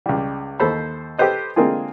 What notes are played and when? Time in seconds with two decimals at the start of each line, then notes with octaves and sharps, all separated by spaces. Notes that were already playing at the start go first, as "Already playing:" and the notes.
0.06 C#2 G3
0.60 D#2 A4 C5 B5
1.18 G4 A4 B4 C5 D#5
1.56 D3 G#3 A#3 C4 F4 G#4